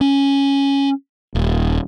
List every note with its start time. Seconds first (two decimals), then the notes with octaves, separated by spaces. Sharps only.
0.01 C#4
1.35 D#1